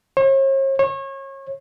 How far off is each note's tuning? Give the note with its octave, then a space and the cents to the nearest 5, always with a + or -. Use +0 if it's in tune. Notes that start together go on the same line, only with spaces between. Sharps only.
C#5 -45
C#5 -30